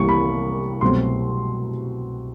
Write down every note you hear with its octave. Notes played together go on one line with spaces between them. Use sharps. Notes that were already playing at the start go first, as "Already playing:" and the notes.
Already playing: C2 C3 E3 G3 A#3 C#6
B5
C2 B2 F#3 A3 C4 C6